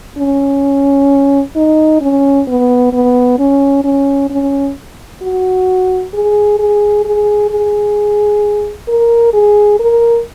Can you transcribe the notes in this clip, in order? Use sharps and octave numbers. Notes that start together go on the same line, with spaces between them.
C#4
D#4
C#4
B3
B3
C#4
C#4
C#4
F#4
G#4
G#4
G#4
G#4
A#4
G#4
A#4